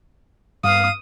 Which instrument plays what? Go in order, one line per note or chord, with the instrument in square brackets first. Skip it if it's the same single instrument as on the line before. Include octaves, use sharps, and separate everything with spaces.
[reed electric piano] G2 [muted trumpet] F5 [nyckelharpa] D#6